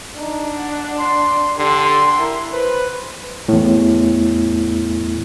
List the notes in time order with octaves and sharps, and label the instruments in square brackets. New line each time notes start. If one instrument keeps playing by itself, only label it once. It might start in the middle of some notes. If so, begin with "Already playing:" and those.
[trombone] D4 [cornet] D#4
[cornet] F#5
[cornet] D5 [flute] C6
[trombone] D3 [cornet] G4 [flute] C6
[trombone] E4 [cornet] A#4
[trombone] B4 [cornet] C5
[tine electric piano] E2 A2